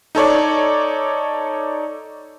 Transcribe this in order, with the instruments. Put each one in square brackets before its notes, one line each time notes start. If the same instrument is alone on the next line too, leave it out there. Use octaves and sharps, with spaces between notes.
[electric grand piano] D#4 A4 C#5 D5